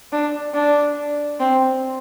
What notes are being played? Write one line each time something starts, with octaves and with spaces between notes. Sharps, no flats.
D4
D4
C4